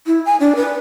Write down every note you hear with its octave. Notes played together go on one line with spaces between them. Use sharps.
E4
G#5
D4
B4